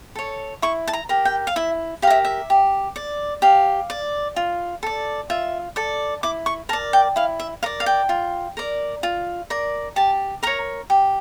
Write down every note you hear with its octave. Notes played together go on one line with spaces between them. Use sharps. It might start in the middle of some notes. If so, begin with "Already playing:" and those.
A4 C#5
E4 C#6
A5
A#5
G4 A#4
G5
F5
E4 E5
G4 A#4 E5 F5
E5
G4
D5
G4 F5
D5
F4
A4 D5
F4 E5
A4 D5
E4 D6
C#6
A#4 D5 A5
G5
E4 F5
E5
A#4 D5 F5
F5
G5
F4
A#4 D5
F4
A#4 D5
G4 A5
A#4 C#5 A#5
G4